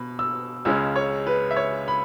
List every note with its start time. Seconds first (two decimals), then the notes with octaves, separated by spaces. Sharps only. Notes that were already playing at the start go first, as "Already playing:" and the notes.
Already playing: B2 B5
0.19 E6
0.65 C#2 C#3 G#3 C#4 E6
0.96 C#5
1.27 B4
1.51 E5
1.56 C#5
1.88 B5